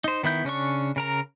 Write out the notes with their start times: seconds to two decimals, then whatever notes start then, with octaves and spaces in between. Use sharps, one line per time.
0.04 D#4 C5
0.23 D#3 B3 E4 G6
0.45 C#3 C#4 D4 C#6
0.96 C#3 A#4 A#5